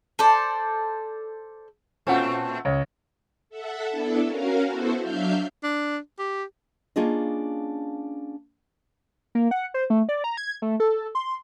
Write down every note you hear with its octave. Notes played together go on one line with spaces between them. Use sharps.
A4 C5 D5
A#2 A3 C4 C#4 F4 F#5
C#2 C#5
A4 E5 F#5
B3 D4 E4 A4
C#4 F#4 A#4 F5
B3 E4 F#4 A4 C5
F#3 D4 E5 F5 F6 G6
D4
G4
A#3 C#4 D4 F4 G#4 D#5
A#3
F#5
C5
A3
D5
A#5
G#6
A3
A4
C6